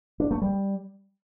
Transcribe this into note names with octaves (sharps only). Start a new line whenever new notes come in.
D4
A3
G3